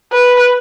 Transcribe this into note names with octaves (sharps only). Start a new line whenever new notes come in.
B4